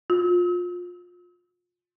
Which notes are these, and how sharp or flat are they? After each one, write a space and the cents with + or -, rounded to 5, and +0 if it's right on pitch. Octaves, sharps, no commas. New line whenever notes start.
F4 +25